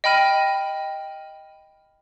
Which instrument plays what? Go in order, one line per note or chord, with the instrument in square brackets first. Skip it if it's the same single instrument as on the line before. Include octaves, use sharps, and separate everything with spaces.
[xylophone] D#5 G5 B5 F6 D#7